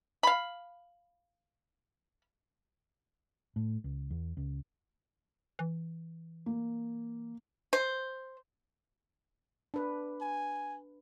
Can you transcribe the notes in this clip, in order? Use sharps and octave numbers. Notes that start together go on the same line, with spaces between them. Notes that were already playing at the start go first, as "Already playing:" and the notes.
F5 B5
A2
C#2
E2
C#2
E3
A#3
C5
D4 B4
G#5